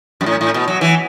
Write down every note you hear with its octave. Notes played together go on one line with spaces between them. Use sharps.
F#2
A2
A2
B2
F#3
E3